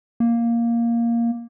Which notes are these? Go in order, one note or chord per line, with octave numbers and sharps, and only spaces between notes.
A#3